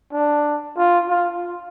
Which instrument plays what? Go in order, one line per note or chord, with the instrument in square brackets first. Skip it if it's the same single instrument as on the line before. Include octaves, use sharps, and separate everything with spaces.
[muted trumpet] D4
F4
F4